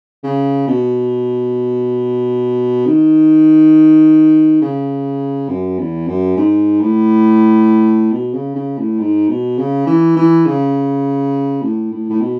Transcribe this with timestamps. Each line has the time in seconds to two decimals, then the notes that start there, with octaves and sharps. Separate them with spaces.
0.24 C#3
0.68 B2
2.86 D#3
4.61 C#3
5.49 F#2
5.79 E2
6.08 F#2
6.37 G#2
6.81 A2
8.12 B2
8.34 C#3
8.56 C#3
8.78 A2
9.00 G#2
9.29 B2
9.58 C#3
9.87 E3
10.17 E3
10.46 C#3
11.62 A2
11.92 A2
12.10 A2
12.21 B2